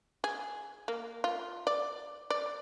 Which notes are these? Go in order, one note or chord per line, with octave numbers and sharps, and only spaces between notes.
G#4
A#3
F4
D5
D5